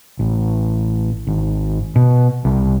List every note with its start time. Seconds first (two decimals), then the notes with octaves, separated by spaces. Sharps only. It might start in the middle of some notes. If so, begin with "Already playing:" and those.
0.19 A1
1.27 G#1
1.96 B2
2.45 C2